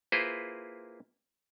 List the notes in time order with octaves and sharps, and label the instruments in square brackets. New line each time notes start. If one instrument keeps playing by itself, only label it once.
[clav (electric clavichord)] A#3 E4 F4 G#4 B4 C5